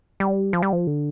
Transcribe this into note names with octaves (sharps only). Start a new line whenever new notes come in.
G3
F3
G3
F3
D3